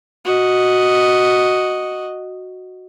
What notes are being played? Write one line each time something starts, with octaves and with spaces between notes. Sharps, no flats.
F#4 D#5